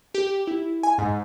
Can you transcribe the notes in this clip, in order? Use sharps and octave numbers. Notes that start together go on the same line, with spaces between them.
G4
E4
G#5
G#2